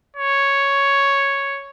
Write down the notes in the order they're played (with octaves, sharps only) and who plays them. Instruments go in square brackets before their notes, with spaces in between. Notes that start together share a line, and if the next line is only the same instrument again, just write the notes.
[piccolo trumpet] C#5